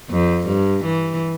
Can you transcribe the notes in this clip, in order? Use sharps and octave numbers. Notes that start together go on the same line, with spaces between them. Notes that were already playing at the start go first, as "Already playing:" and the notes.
F2
G2
E3